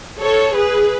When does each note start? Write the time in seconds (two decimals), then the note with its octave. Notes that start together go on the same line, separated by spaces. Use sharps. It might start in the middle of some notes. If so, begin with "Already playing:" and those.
0.21 A4 C#5
0.55 G#4 B4